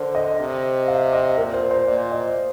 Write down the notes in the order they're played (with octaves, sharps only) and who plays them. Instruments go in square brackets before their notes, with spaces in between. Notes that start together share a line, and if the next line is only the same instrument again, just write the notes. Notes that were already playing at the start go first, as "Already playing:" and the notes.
Already playing: [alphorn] D3 [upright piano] A#4 C5
[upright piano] D#5
[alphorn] C3
[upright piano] F5
D#5
[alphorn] A#2 [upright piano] A#4
[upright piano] C5
C5
[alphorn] A#2 [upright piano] D5
[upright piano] D#5